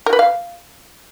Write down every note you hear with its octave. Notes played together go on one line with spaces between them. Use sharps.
A#4
B4
F5